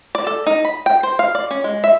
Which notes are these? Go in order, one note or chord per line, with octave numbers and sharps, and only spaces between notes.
D5
A4
D#4
B5
G5
C5
F5
D5
C#4
G#3
E5